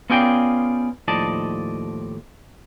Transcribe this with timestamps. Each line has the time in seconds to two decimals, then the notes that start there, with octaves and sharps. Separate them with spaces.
0.10 B3 C#4 F4 G#4 D5 G5
1.08 D#2 A2 F3 D5 D#5 A5